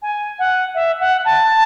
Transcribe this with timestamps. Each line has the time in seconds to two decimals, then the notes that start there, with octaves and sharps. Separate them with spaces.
0.02 G#5
0.39 F#5
0.75 E5
1.00 F#5
1.25 A5